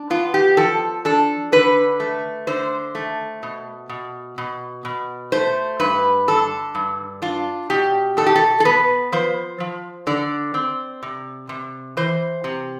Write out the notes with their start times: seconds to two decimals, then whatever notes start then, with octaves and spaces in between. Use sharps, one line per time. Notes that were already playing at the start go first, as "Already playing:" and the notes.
Already playing: D4
0.10 B3 F4
0.34 G4
0.57 F3 A4
1.05 D4 A4
1.52 D3 B4
2.00 A3
2.47 D3 C5
2.95 A3
3.43 B2
3.89 B2
4.38 B2
4.85 B2
5.32 A3 C5
5.80 G2 B4
6.28 D3 A4
6.75 G2
7.22 D4 F4
7.70 B2 G4
8.17 B2 A4
8.26 G4
8.36 A4
8.60 A4
8.65 B3 B4
9.12 F3 C5
9.60 F3
10.07 D3 D5
10.54 C4
11.03 C3
11.49 C3
11.97 E3 C5
12.44 C3